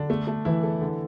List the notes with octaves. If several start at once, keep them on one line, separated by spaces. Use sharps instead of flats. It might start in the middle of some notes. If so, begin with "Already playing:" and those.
Already playing: D3 D4
A3
A3
E3 E4
A4
D3